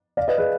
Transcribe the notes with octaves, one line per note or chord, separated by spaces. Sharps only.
D5 F5
B4 D#5
G#4 B4